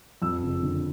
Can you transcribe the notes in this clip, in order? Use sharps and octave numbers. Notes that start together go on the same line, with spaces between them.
F2 E6
F#1
D3